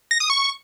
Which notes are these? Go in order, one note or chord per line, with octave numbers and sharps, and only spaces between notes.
A#6
D#6
C#6